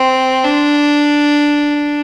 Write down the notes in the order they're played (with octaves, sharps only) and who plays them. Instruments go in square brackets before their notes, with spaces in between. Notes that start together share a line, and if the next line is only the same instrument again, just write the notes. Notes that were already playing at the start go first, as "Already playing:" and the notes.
Already playing: [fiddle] C4
D4